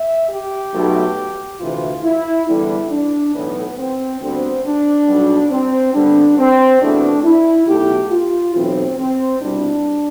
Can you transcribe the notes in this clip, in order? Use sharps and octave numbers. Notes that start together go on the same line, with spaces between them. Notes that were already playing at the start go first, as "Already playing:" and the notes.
Already playing: E5
G4
B1 B2 A3
D2 C3 E3 F4
E4
E2 D3 G3 E4
D4
B1 A2 E3 B3
C4
D2 D3 G3 B3 C4
D4
B1 B2 G3
C4
G2 D3 G3 B3 D4
C4
E2 B2 A3 D4
E4
B1 B2 A3 G4
F4
B1 A2 E3 C4
C4
C2 B2 G3 D4